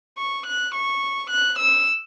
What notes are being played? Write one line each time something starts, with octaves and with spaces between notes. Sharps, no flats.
C#6
F#6
C#6
F#6
E6